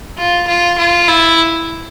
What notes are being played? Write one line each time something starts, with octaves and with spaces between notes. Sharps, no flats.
F4
F4
F4
E4